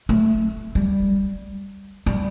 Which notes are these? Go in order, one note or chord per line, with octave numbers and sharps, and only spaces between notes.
A3
G3
G3